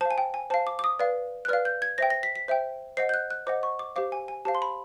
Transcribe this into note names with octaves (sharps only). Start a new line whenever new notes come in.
C5 F5 A5
G#5
G5
G#5
C5 F5 A5
D6
D6
D#6
B4 D5 F5
F#6
B4 D5 F5 F6
G6
G#6
C5 E5 G5 A#6
A#6
B6
B6
C5 E5 G5
C5 D#5 F#5 C7
G6
F#6
F#6
C5 D#5 F#5 D6
C#6
D6
G4 C5 F5 D6
G#5
G#5
G4 C5 F5 A5
C6
B5